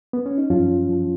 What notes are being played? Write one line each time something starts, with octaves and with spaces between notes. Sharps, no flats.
B3
C#4
D#4
F#2 F3 C#4 F4
F3